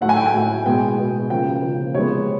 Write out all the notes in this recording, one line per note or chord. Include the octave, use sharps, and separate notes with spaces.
A2 F#3 A3 F#5
G#5
G5
G#5
A2 F#3 A3
B2 G#3 B3 G5
B2 G#3 B3
C#3 F3 A#3 G5
C#3 F3 A#3
C3 F3 G#3 B3 C#5